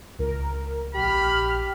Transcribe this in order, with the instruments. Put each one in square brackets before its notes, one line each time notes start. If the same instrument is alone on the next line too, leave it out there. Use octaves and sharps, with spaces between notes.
[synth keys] C#2 [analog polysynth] A#4
[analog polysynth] A#1 F6 [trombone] G4 [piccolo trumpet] B5